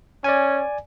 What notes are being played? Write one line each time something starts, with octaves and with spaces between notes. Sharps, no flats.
C#4 D5 G#5